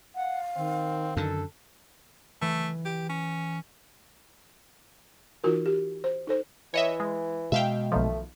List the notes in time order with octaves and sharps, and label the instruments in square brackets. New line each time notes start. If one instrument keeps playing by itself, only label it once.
[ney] F5 [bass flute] F#5
[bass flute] D#3 [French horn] C4
[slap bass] F#2 D3 [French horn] A4
[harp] E3 [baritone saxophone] A3
[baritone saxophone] G4
C#4
[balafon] E3 D#4 F4 F#4 A#4
G4
C5
D#4 A4 C5
[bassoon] E3 [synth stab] C#5 D#5 E5
[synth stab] G#3
[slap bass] B2 G#3 [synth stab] E5 F5 G5
[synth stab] B1 D#3 F3 [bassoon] A3